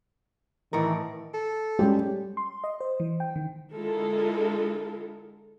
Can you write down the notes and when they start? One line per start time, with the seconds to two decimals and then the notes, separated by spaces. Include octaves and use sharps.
0.73 A2 D#3 E3 A#4
1.34 A4
1.79 G3 G#3 C#4 G4
2.37 C6
2.64 D#5
2.81 C5
3.00 E3
3.20 G5
3.36 D#3
3.75 D3 G#3 E4 F4 A4 A#4